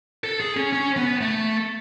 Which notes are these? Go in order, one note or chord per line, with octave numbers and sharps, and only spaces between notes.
A4
G#4
C#4
C#4
B3
A3